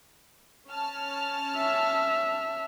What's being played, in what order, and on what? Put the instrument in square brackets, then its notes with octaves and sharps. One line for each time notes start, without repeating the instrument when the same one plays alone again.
[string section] C#4 A5 F6
[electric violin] E5